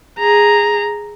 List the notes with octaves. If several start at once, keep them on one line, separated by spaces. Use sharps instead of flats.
G#4 A#5